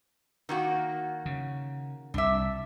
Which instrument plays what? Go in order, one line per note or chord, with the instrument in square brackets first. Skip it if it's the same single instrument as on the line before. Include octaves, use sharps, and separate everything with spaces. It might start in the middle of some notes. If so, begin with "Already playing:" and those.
[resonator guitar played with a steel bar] D#3 A#3 F#4
[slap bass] C#3
[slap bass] C2 [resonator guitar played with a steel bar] D4 E5